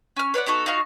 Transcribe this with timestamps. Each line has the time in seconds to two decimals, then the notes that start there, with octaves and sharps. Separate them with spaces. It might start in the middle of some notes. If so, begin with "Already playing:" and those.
0.17 C#4 F6
0.34 B4 C#5 D5 F#5
0.46 B3 D#4 F#4 A4
0.66 D#4 F4 F#4 F5